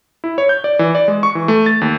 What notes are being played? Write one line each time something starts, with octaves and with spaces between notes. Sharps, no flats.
E4
C#5
G6
D5
E3
D5
G#3
C#6
E3
A3
A6
D#2